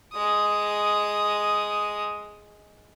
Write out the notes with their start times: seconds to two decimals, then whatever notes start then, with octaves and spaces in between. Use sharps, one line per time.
0.13 G#3 D#6